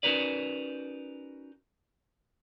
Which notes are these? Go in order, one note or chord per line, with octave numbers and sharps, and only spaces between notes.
C#4 D#4 F#4 A#4 B4 D5